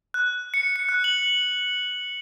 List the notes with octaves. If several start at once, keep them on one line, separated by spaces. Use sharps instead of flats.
F#6
C#7
C#7
F#6
F#7